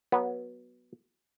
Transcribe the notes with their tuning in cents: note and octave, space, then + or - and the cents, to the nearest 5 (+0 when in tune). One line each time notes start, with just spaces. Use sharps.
F#3 +0 B3 -15